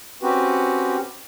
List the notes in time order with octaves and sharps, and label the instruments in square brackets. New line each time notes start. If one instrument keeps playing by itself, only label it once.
[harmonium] C4 C#4 F#4 G4 B4